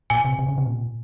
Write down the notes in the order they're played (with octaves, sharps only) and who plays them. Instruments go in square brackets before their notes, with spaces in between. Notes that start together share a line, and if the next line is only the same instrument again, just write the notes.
[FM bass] A#2 [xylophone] G#5
[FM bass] C3
C3
C#3
C3
A#2